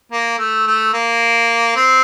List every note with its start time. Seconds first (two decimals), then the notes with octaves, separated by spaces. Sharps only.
0.12 A#3
0.38 A3
0.67 A3
0.93 A#3
1.76 C4